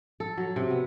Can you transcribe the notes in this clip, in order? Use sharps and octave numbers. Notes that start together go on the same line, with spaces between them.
A4
F#3
C3
B3